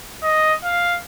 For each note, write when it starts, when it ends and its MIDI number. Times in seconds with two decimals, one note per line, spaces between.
0.23 0.55 75
0.64 0.97 77